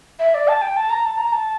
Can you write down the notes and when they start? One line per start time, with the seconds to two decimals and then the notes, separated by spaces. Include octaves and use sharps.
0.19 E5
0.34 D5
0.48 A5
0.62 G5
0.76 A5
0.90 A#5
1.04 A5
1.18 A#5
1.32 A5